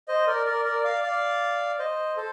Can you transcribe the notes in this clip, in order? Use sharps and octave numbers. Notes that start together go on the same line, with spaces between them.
C5 D#5
A#4 D5
A#4 D5
A#4 D5
D5 F5
D5 F5
C5 D#5
A4 C5